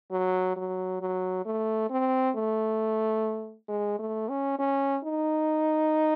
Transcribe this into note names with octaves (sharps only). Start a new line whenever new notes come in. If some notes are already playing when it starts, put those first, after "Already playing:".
F#3
F#3
F#3
A3
C4
A3
G#3
A3
C#4
C#4
D#4